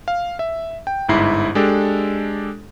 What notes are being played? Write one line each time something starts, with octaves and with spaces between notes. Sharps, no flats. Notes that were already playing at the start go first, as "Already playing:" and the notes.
F5
E5
G5
G1 G#2 E4 C7
G#3 D4 G4 A4